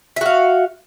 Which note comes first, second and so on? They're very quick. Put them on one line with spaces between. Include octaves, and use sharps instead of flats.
E5 F#4 F5